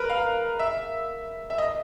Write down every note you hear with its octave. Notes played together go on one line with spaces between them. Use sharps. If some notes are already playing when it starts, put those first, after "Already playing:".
Already playing: A#4 B4
F5
E5
E5
D#5